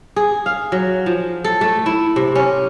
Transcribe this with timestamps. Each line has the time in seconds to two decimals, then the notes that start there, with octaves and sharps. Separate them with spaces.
0.16 G#4
0.46 F5
0.72 F#3
1.06 F3
1.44 A4
1.61 A3
1.86 E4
2.16 C3
2.35 C#4